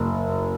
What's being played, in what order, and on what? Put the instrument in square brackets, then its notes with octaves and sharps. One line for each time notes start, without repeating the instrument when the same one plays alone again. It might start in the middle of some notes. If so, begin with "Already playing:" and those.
Already playing: [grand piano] F#1